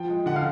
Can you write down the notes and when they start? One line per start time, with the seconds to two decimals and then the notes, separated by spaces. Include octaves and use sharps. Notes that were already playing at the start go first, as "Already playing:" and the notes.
Already playing: F3 G5
0.09 G#3
0.26 D3 F#5
0.36 F5